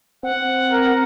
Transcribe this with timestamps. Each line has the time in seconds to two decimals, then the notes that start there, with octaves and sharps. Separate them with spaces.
0.23 C4 F#5
0.71 A#4